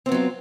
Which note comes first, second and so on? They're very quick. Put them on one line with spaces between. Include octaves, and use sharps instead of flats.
C4 B3 F#3 F4